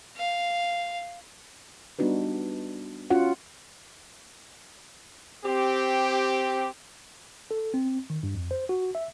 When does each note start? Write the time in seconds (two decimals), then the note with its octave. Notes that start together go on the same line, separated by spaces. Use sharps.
0.17 F5
1.99 G3 B3 D4 D#4 F#4 B4
3.10 C#4 F4 F#4 F#5
5.45 C4 G4
7.51 A4
7.74 C4
8.10 D#3
8.23 G2
8.35 F2
8.51 C5
8.69 F#4
8.95 E5